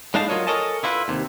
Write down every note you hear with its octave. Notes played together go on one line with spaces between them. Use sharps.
A2 G#3 D4 D#4 F5 A5
F#3 F4 A#4 C#5 D#5
A4 A#4 C#5 D#5 G#5 A5
D3 E4 F4 A4 B4
D#2 C3